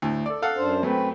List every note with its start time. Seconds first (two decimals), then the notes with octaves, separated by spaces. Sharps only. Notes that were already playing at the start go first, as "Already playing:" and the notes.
0.02 D2 A2
0.26 A4 D5
0.42 A4 F5 F#5
0.57 F#2 D4 C5
0.83 F#2 A3 C4 B4